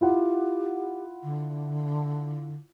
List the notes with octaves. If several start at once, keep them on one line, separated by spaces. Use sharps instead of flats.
E4 F4 G4 F#5
D3